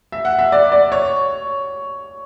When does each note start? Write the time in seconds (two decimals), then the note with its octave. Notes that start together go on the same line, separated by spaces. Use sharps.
0.12 E5
0.25 F#5
0.39 E5
0.52 D5
0.72 D5
0.92 C#5